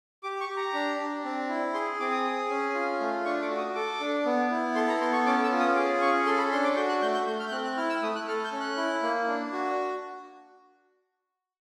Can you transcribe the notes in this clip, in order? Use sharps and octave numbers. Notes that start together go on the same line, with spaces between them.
G4 D6
C#6
G4
A#5
D4
D4
C4
E4
G#4 C6
C4 D6
D#6
G#4
C#4
F4
A3
D4 C#6
D6
F#4
D#6
A4 D6
D4
B3
E4
A4 C6
A#5
B3 C6
C#6
C#4 D6
E6
F4
D#6
G#4 D6
C#4 C#6
A4 C6
B5
D4 C6
D6
F#4 G6
F#6
A3 G6
G6
A3 G6
F6
G6
C4 F#6
F#6
E4 F6
E6
A3 D#6
F#6
A4 F6
G6
C#4
F#6
E4
A#3
D4
F#4